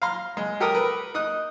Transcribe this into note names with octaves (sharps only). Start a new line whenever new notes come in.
F5 A#5 C6 F6
G#3
G4 A4 A#4 D#6
A#4 B4
D#4 D#6 F#6